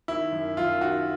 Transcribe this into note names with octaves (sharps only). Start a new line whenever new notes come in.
D#3 E4
F#2
F#2 F4
D#3 F#4